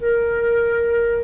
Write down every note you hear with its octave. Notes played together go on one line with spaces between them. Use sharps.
A#4